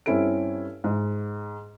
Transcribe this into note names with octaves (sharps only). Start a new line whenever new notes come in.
G2 C4 C#4 E4 A4 D7
G#2